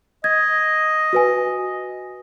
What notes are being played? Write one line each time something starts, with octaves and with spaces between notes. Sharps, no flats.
D#5 G#6
F#4 B4 G#5